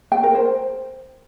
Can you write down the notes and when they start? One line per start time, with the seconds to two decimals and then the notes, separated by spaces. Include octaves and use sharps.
0.12 G5
0.23 A#4
0.35 C5